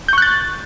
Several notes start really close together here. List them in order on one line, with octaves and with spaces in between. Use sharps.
G6 C#6 F#6 A6